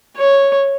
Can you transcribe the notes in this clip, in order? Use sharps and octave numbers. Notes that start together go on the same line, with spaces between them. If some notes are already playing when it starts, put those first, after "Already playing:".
C#5